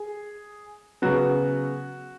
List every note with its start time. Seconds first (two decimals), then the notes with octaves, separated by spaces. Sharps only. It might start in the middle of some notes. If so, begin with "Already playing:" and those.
Already playing: G#4
1.02 C#3 F#3 B3 F#4